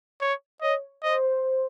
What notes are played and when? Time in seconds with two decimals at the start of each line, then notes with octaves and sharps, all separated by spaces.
0.21 C#5
0.62 C#5 D#5
1.03 C5 D#5